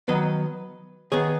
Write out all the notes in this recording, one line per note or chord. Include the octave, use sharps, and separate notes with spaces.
D#3 F#3 B3 B4 D#5
D#3 B3 G#4 C#5